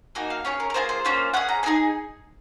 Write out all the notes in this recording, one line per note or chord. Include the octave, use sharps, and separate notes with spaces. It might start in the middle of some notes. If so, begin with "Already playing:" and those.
A#3 D#4 F#4 G#5
F5
C#4 F4 G#4 C#5
A#4
A#4
A#3 F4 G#4 C5
C5
A#3 C#4 F4
C#4 G#4 F#5
A#5
A#3 D#4 G#4 G#5